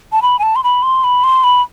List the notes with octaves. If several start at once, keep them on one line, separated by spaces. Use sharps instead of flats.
A5
B5
G#5
A5
C6
B5
C6
B5
C6
B5